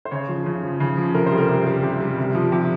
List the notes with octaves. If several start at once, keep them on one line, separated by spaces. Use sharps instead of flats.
C5
C#3 C#5
F3
C#3
F3
C#3
F3
C3 A#4
C5
G3
A#4
C3
G3
C3
G3
C3
F3
C3